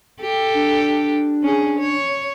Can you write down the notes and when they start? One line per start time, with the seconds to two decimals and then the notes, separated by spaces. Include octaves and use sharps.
0.21 G4 A4
0.55 D4
1.43 C#4 G#4
1.79 C#5